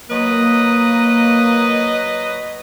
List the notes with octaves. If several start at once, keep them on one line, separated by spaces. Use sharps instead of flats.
F#3 A#3 B4 D#5